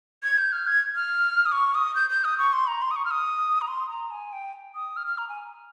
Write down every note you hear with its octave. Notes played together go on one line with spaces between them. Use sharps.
G#6
G6
F6
G#6
F6
D#6
C#6
D#6
G6
G6
D#6
C#6
C6
A#5
C6
D#6
C#6
F6
D#6
A#5
C6
A#5
G#5
G5
D#6
F6
F6
A#5
G#5